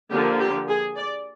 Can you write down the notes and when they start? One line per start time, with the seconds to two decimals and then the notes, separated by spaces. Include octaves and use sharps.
0.11 D3 F3 A#3 G4
0.40 G4
0.68 G#4
0.97 D5